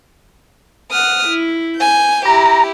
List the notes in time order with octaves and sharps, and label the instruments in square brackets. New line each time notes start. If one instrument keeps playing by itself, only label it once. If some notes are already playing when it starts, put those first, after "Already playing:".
[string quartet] F#5 D#6 F6
E4
G#5 G6
[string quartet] E4 G4 [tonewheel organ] A#5